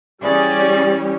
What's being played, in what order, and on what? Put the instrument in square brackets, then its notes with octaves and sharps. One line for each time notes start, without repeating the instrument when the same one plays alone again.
[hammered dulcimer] C#3 E3 G#4 [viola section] G3 [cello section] C#4 [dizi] D5